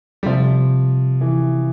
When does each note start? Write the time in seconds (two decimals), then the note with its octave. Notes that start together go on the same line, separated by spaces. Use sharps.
0.23 G3
0.26 C3 F3
1.21 E3